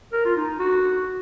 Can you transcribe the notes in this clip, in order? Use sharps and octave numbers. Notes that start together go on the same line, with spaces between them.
A#4
F4
D#4
F#4